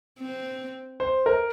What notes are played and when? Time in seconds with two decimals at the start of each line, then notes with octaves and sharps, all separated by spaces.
0.20 C4
1.00 C5
1.26 A#4